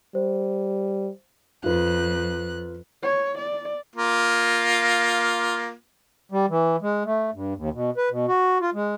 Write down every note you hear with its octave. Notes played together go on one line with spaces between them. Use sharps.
G3 C5
F2 F4 B4 F#6
C#5
D5
A#3 F4
G3
E3
G#3
A3
G2
D#2
B2
B4
B2
F#4
F4
G#3